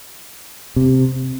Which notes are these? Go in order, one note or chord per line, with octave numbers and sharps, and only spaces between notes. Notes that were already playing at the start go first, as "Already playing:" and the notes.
C3